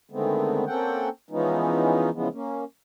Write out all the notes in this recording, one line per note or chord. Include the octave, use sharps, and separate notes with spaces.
D3 D#3 G#3 A3 B3 C4
A#3 C4 C#4 A4 F#5 G5
E3 F3 G#3 B3 C#4 D#4
C#3 E3 F3 G#3 B3
A#3 C#4